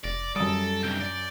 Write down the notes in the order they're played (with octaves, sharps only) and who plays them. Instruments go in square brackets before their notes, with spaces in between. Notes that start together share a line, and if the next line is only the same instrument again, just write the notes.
[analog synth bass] F1 [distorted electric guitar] D5 [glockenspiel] A#6
[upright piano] F#2 D#6 [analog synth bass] G3 [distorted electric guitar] A4 [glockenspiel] D7
[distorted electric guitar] C2 G2 [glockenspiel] G6 D7 G7
[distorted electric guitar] D5 [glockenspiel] D7